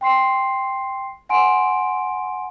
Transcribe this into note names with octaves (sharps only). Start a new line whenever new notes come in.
G5 C6 C7
F#5 G#5 C6 D7